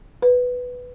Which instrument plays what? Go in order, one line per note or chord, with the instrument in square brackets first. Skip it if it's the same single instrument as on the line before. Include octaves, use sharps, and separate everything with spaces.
[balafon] B4